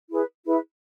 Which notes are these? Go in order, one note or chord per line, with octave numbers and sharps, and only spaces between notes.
E4 G#4 B4
E4 G#4 B4